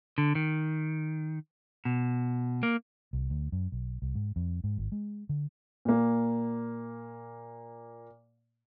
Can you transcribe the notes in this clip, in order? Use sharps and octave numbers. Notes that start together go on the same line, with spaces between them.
D3
D#3
B2
A#3
C2
D2
F#2
B1
C2
G#2
F2
G#2
G#1
G#3
D3
A#2 A#3